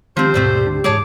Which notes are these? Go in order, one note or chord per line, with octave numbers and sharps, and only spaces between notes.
D#3 F3 G#3 C4 D4 G4 C5
D#1 G#2 B2 G3 A3 C4
D2 G#3 D4
G#2 E3 G#3 G#4 C#5 A5 D6